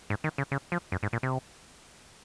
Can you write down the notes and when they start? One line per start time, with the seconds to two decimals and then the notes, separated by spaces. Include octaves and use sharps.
0.10 G#2
0.24 D#3
0.38 C#3
0.52 C#3
0.72 F3
0.92 F#2
1.03 G#2
1.13 A#2
1.23 C3